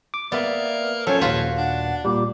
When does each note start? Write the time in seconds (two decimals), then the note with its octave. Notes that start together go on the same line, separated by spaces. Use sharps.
0.14 D6
0.32 A#3 B3 D5 E5
1.07 F3 F#3 C#4 A4 C#5
1.21 D#2 A#2 F4 F#4 B4 F5
1.58 D4 F#5
2.05 A#2 G3 D6